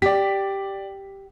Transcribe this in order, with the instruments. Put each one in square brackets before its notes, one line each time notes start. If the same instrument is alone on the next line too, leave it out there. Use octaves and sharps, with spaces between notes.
[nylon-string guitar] G4 [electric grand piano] D5 B6